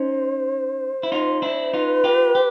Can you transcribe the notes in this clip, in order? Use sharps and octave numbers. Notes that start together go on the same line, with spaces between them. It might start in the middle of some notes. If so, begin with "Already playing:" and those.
Already playing: C#4 D#4 C5
E4
D#4 F4
D4 E4
D#4 F4 B4
F4 G4
G4